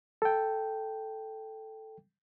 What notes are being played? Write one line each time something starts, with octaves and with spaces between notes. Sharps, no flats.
A4 G5